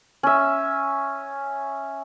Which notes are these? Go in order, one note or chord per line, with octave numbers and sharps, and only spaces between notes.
C#4 E5